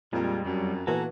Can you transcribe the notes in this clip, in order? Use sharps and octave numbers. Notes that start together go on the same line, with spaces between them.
F2 A#2 G3 G#3
F#2 F#3 G3
A#2 E3 B3 F#4 A4 G#5 A#5